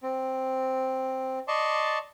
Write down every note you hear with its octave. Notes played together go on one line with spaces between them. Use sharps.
C4
D5 D#5 A5 C6 C#6